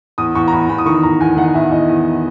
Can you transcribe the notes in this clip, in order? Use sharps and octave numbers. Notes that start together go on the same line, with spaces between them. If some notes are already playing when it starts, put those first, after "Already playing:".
E2 D#6
E2 C#6
A#5
E2 B5
E2 B5
D#6
D#3 C#6
E2 A#5
E2 G#5
D#3 F#5
E2 E5
E2 D#5
E2